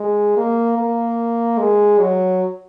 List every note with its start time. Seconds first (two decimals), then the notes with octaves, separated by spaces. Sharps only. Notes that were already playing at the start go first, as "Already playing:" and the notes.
Already playing: G#3
0.37 A#3
0.77 A#3
1.59 G#3
1.99 F#3